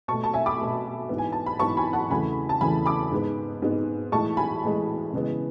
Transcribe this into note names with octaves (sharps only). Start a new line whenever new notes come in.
B2 A3 A5 C#6
A5
E5 G#5
B5 D6
B2 A3
G#2 E3 B3
G#5
A5
B5
G#2 E3 B3 A5 C#6
G#5 B5
F#5 A5
E2 C#3 E3 A3 G#5 B5
A5
E2 C#3 E3 A3 G#5 B5
B5 D6
G#2 G#3 B3
G#2 G#3 B3
A2 E3 G#3 A5 C#6
G#5 B5
A2 E3 G#3
C#3 E3 G#3 B3